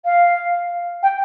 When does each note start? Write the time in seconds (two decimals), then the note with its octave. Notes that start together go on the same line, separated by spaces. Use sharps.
0.05 F5
1.03 G5